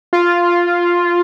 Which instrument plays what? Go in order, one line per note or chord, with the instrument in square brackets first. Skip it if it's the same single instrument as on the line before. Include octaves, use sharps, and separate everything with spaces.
[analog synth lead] F4